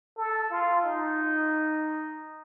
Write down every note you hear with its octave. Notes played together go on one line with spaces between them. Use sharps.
A4
F4
D#4